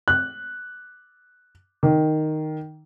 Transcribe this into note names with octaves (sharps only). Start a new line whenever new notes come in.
F#6
D#3